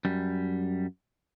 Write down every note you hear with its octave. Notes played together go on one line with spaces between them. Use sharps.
F#2 G3